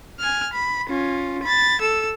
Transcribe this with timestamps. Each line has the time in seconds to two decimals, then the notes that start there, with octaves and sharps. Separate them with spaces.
0.20 G#5 F6
0.53 B5
0.89 C#4 F4
1.43 B5 A6
1.81 A4 E6